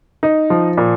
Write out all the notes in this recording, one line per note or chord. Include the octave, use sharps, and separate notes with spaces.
D#4
F3
A#2